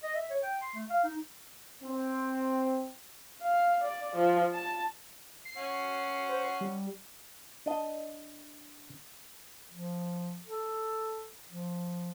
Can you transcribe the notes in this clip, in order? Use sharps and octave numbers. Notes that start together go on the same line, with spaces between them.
D#5
E5
C#5
G5
C6
A3
F5
D#4
C4
F5
D5
F3
A5
C7
C#4 F#5
C5
C7
G3
D4 D#5
F3
A4
F3